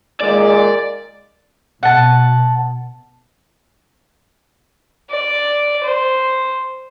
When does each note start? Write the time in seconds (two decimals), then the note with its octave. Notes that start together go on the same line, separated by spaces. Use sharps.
0.21 A#2 D#3 G#3 D5
1.83 B2 F#5 A5
5.10 D5
5.83 C5